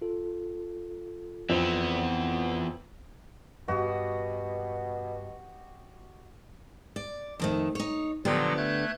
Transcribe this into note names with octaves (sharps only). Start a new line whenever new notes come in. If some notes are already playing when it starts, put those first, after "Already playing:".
F4 A4
F2 E3 B3 C4
G2 B2 F#4 G4 D#5
D5
F2 D#3 A3
D#4 C#5
A#2 D3 F3 F#3 B3 G4
A3 F#6 G#6